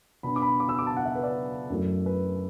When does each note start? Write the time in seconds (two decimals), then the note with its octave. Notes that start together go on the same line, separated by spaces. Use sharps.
0.23 B2 B3 D4 B5
0.36 D6
0.42 B5
0.60 D6
0.69 E6
0.79 D6
0.87 A5
0.97 F#5
1.05 E5
1.15 B4
1.23 D5
1.70 F#2 F#3 A3 E4
2.06 B4